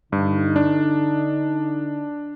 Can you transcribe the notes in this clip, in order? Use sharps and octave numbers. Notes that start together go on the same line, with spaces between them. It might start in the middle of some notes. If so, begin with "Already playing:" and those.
G2 D3 D#4
D4